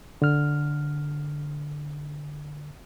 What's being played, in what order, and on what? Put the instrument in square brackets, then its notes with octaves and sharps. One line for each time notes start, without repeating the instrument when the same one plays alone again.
[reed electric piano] D3 F6